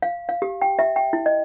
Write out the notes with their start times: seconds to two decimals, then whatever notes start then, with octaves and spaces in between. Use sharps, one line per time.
0.02 F5
0.29 F5
0.42 G4
0.62 G5
0.79 E5
0.96 G5
1.13 E4
1.26 D#5